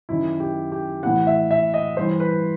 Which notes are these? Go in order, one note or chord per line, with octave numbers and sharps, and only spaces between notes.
F#2 D#3 E4
G4
G4
A2 E3 F#5
E5
E5
D#5
G2 E3 C5
B4